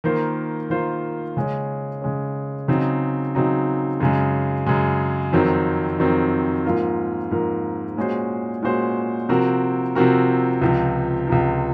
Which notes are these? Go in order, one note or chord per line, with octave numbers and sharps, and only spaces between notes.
D#3 A#3 F4 C5
D#3 A#3 F4 C5
C#3 G#3 C#4
C#3 G#3 C#4
C#3 F#3 C4 D#4
C#3 F#3 C4 D#4
F#2 C#3 G#3
F#2 C#3 G#3
F2 D#3 F#3 C4
F2 D#3 F#3 C4
G#2 F3 A#3 F4 A#4
G#2 F3 A#3 F4 A#4
A#2 G#3 C#4 F#4 C5
A#2 G#3 C#4 F#4 C5
C3 F3 C4 F#4 A#4
C3 F3 C4 F#4 A#4
C#2 C3 F3
C#2 C3 F3